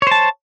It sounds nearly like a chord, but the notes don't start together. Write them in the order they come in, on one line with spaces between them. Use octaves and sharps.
C#5 C5 A5